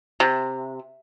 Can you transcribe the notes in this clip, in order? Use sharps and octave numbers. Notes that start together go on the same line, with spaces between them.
C3